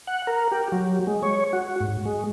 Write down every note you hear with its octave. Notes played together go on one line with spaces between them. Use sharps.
F#5
A#4
G4
F#3
G#3
C#5
F#4
G#2
G#3